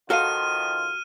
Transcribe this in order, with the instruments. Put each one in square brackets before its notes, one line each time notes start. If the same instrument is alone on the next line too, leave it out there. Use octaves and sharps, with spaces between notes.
[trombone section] D#3 F3 F4 [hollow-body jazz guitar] F#4 A4 F5 [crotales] F6 D#7